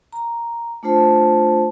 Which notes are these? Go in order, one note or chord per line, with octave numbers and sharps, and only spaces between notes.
A#5
A3 D4 F4 C5 A5